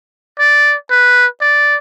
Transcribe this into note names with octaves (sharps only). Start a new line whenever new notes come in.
D5
B4
D5